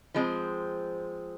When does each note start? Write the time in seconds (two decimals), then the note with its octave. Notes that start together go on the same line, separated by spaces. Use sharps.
0.14 F3 G#3 C4